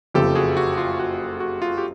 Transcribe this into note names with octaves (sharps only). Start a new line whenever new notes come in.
F#1 F2 C#3 G4 A4
F#4 G#4
F#4
F4
F#4
F#4
F4
G4